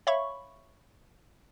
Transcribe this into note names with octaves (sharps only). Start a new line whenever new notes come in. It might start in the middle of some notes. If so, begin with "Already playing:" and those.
C#5 E5 F5 B5 C#6